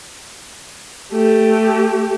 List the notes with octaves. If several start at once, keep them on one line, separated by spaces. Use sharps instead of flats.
A3 G4